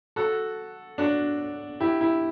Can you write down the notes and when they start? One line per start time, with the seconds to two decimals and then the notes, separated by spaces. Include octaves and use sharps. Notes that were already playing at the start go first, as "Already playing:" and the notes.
0.16 F#4 A4
0.98 D4 F#4
1.80 E4 G4
2.01 E4